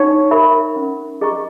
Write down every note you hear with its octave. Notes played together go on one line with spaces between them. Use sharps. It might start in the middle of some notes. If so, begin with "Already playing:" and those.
Already playing: D#4 C#5
A#4 E5 B5
C#4
G#4 D#5 A#5 C#6